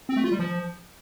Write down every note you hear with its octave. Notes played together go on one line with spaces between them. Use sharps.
C4
A3
F4
G3
F3